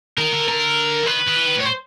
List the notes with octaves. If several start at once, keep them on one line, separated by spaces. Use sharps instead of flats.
D#3 A#4
D3
A#4
E3
D#3 B4
D#3
E3
D#3
A2
C#5
C5